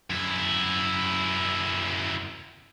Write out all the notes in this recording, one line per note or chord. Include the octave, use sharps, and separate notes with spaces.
F#2 E4